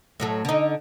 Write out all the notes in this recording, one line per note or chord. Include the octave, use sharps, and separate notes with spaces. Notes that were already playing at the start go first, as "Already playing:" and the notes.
A2 F#3 A3
D3 D#4